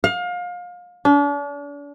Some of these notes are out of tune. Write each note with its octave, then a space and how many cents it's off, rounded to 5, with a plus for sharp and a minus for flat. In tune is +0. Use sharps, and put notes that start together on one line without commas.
F5 +30
D4 -40